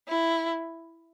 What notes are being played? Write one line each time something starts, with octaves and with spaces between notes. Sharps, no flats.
E4